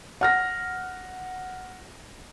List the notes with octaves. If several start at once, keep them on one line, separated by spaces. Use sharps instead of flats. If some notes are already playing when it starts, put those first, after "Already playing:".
F#5 F6 A#6